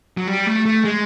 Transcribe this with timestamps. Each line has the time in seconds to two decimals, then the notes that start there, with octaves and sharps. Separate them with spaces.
0.17 F#3
0.27 G3
0.47 A3
0.66 A3
0.85 G#3